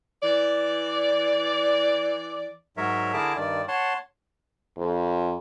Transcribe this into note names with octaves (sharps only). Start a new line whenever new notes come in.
E3 D5
G#2 F#3 A#4 C#5 E5
D3 E4 G#4 A#4 A5 D6
G2 D#3 D5
C#5 F#5 A5 C6
F2